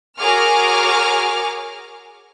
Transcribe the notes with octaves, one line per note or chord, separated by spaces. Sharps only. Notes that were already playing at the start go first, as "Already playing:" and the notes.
F#4 G#4 A#4 C#5 D6 F6